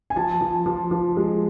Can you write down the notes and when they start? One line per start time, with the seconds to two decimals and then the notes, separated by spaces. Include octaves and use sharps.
0.10 G#5
0.16 F3 A5
0.41 F3
0.66 F3
0.91 F3
1.17 G#3